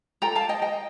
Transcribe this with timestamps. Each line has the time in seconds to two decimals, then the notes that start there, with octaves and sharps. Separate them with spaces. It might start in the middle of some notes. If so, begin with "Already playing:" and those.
0.22 F4 A4 G5 A#5
0.35 F5 A5
0.49 D#5 G5
0.62 D#5 G5